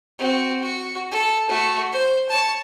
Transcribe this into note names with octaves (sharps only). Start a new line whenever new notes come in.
C4 F#4
F#4
A4
A3 F#4
C5
C#5 A5